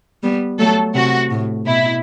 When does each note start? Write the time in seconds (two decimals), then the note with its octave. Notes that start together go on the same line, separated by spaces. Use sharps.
0.23 G3 B3
0.59 F#3 A3 A4
0.95 C3 F#4
1.31 A2
1.66 B2 E4